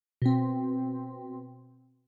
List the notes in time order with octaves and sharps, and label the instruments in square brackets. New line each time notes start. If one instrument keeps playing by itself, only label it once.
[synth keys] B2 C4